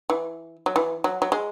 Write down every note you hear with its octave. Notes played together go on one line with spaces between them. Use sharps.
E3
F#3
E3
F#3
F#3
G#3